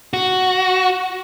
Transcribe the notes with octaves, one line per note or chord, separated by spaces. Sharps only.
F#4